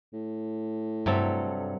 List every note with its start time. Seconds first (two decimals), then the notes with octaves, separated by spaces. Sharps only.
0.13 A2
1.06 G2 C3 F#3 A4